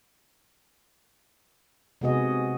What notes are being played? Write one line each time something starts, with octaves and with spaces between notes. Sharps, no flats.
C3 G#3 B3 F#4 G#4 D#5